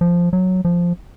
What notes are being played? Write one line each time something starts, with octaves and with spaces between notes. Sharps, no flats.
F3
F#3
F3